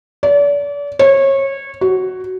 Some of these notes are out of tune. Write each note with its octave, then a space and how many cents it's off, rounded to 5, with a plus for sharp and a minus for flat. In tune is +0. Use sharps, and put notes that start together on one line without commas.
D5 -35
C#5 -25
F#4 +10